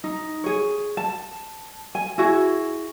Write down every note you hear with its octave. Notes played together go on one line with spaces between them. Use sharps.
D#4
G#4 C#5
A5
G#5
E4 F#4 G#4